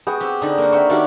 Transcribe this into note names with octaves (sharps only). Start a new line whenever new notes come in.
B3 F#4 G#4 G5
C4 G4
D3 D#4
A#3 F#4
C4 E5 G5 C#6
D#3 C#4 D4 F#4 G4 F5